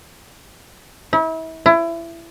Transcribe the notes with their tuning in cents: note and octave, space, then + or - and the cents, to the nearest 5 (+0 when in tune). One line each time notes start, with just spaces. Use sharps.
E4 -35
E4 +25